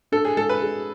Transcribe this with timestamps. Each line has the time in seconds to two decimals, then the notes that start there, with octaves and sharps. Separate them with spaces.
0.12 D4 A4
0.25 G#4
0.37 G#3 A4
0.49 B4
0.62 G#4